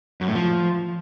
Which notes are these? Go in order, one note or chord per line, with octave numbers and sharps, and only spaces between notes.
F#2
A2
F3